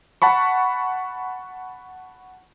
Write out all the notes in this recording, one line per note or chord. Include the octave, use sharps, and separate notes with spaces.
F#5 A5 B5 C#6